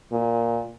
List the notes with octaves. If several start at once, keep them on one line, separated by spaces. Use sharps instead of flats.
A#2